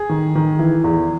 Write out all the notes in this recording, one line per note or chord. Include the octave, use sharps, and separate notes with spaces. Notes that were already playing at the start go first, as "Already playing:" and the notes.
Already playing: G#4
D#3
D#3
E3
E2